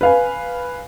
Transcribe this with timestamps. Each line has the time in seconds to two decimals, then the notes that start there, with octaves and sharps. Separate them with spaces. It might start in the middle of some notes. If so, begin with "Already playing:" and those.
0.01 B4 F5 G#5